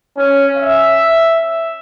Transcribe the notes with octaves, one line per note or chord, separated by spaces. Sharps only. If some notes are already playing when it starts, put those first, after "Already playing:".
C#4
E5